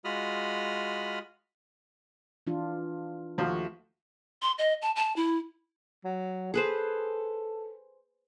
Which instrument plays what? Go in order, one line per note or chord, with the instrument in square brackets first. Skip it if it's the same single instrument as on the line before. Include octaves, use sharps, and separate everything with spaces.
[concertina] G#3 F4 F#4 B5 D#6 F6
[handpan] E3 D4 F4
[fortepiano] D#2 F3 [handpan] A3 F#4
[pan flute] C6
D#5
A5
A5
E4
[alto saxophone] F#3
[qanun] G#4 B4 C5 [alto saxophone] A4